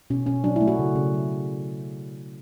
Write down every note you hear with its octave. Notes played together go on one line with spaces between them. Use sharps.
B2 C#4
B2 C#4
F#3 D4
A3 E4
F#4
C#3
C#3
F#3